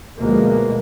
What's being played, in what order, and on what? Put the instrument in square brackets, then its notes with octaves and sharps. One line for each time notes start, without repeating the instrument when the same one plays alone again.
[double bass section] D2 B2 F3 G#3 A#3